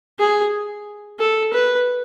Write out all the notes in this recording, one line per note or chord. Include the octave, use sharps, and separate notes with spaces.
G#4
A4
B4